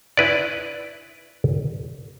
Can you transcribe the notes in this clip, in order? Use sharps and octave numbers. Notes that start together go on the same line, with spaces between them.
E4 B4 D5